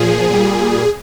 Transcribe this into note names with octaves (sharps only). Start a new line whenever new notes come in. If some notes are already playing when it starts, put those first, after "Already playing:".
Already playing: A#2 F3 G#4
A#2 G3